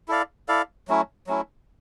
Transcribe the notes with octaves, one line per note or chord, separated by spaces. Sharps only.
E4 A4 D5 F5
E4 A4 D5 F5
F#3 A3 C#4 E4
F#3 A3 C#4 E4